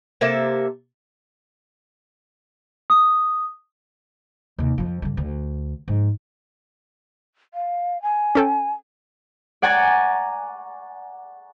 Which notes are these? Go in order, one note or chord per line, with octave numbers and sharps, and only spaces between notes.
C3 A#3 A4 E5
D#6
D#2 C3
F2 F3
G2 D3
D2
G#2 F3
F5
G#5
C#4 A4 G5
D5 F#5 G#5 A#5 C#6 A6